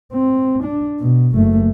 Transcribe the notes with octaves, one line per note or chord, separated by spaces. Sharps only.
C4
D4
B2
F#1 A3